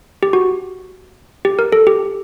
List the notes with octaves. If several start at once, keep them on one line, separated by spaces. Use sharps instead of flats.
G4
F#4
G4
A#4
A4
G4